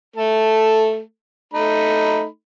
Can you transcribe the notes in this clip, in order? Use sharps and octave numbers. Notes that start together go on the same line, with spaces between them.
A3 A4
A3 D#4 B5